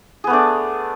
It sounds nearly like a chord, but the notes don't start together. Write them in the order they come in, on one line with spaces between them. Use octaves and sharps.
G#4 B3 A3 D4